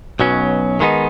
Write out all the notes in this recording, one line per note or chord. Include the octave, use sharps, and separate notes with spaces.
B1 B2 F#3 C#4
D#3 G#3 B3 D#4